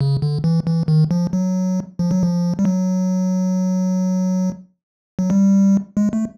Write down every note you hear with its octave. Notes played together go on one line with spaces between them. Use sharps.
C#3
D3
E3
E3
D#3
F3
F#3
F3
F#3
F3
G3
F#3
F#3
G3
G#3
A3